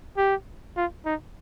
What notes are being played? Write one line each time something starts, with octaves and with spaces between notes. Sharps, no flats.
G4
F4
D#4